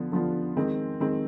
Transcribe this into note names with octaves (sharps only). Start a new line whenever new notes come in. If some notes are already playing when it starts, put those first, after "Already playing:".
Already playing: D3 F3 B3 D4 F4
D3 F3 B3 D4 F4
D#3 G#3 C4
D#3 G#3 C4